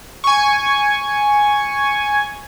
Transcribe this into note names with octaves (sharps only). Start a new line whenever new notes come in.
G#5 C#6